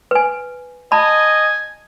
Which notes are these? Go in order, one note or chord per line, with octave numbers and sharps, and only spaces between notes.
B4 G#5
D#5 G#5 A5 B5